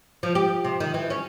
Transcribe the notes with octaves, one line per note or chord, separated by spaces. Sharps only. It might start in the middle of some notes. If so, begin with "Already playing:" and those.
F3
G4
C3
D#3
E3
C#4